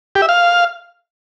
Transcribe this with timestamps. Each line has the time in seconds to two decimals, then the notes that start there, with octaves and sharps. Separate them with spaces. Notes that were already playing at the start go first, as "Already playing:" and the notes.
0.15 G4
0.22 E5
0.29 F5